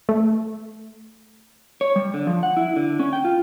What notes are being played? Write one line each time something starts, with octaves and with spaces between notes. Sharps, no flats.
A3
C#5
G3
D3
F3
F#5
E4
D3
C#4
G5
F4